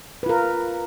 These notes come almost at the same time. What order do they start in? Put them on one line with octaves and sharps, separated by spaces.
B4 F4 A#4